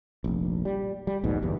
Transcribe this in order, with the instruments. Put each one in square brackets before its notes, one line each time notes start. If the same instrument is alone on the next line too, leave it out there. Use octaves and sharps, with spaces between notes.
[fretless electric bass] F1 A#1
G3
G3
A#1 D#2 G#2 B2
G1 E2 G2